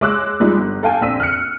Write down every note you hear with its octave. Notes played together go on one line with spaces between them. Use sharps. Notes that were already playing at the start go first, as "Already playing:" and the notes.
G#3 C#5 D6 E6 F#6
F3 G3 G#3 D#4
G1
A4 F5 G5 G#5
A#1 C4 E6 B6 D#7
F6 F#6 C#7